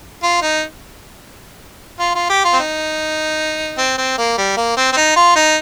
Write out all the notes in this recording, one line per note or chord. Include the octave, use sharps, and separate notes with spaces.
F4
D#4
F4
F4
G4
F4
C4
D#4
C4
C4
A#3
G3
A#3
C4
C4
D#4
F4
D#4